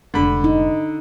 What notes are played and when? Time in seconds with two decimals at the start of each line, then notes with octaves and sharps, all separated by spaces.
0.14 F1 G#2 D3 B5
0.44 D#4